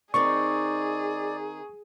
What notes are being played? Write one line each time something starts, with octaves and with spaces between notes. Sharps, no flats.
D#3 C4 D#4 G#4 D5 C#6